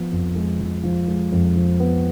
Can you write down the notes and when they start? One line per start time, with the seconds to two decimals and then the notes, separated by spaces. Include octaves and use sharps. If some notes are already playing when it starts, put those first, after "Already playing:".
Already playing: F3 B3
0.11 F2
0.35 G#3
0.59 F3
0.83 F3
1.07 G#3
1.32 F2
1.56 F3
1.80 B3